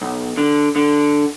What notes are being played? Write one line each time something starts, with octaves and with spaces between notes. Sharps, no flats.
B1
D3
D3